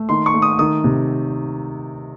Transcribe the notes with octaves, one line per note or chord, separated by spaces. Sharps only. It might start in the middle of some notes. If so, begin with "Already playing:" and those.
Already playing: A3
D#3 C6
C#6
A3
D#6
D#3 D#6
C3